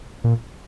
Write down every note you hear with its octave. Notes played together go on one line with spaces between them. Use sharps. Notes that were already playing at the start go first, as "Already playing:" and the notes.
A#2